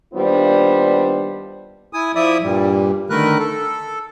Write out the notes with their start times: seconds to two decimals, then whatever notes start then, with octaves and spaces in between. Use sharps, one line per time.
0.14 D#2 G3 B3 D4 F4 C5
1.93 E4 G#5 D#6
2.15 F3 E4 D5 E5 D#6
2.42 G2 A#2 G3
3.10 D3 D#3 A3 A#4 B4 F#6
3.39 A4